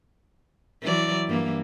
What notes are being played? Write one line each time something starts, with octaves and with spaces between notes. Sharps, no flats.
E3 F#3 D5
G2 E3 A#3